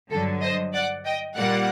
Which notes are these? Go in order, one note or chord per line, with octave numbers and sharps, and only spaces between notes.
G2 D3 F#3 A4
C5 D#5
D5 F#5
D#5 G5
A#2 G3 A#3 D5 F#5